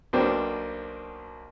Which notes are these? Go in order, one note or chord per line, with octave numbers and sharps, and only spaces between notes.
B1 B2 A#3 D4 C5 G5